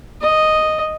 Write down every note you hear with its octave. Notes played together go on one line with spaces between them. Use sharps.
D#5